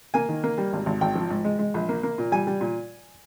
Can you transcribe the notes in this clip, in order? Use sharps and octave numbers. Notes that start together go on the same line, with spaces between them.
A#3 G#5
D#3
A#3
G3
G#1
G#1
G#1 G5
F3
G#2
G#3
G#3
A#1
A#3
A#3
A#2
G3 G#5
G3
A#2